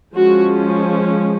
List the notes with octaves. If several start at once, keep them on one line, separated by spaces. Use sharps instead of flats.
F3 G#3 C#4 F#4